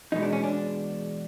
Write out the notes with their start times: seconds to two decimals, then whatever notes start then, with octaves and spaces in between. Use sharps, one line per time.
0.12 E2 B2 G#3 B3 D#4
0.23 D4
0.33 C#4
0.43 D4